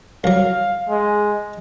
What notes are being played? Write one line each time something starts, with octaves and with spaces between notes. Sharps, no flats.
C2 F#3 F5
G#3